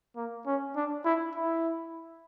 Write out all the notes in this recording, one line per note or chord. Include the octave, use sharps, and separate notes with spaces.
A#3
C#4
D4
E4
E4